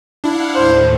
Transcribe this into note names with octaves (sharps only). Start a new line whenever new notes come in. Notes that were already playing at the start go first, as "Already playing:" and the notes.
D4 E4 F5 F#5
D#2 A2 C5